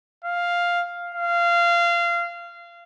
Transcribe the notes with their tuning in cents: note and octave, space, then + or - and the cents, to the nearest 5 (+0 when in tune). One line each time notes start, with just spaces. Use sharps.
F5 +0
F5 -20